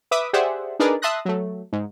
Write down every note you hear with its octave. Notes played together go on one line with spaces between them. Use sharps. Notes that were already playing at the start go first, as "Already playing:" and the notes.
B4 E5 D6 D#6 B6
G4 G#4 C5 D5 E5 F#5
D4 D#4 G#4 A#4 B4 D5
E5 A5 C6 D#6 F#6 A#6
F#3 A3
G#2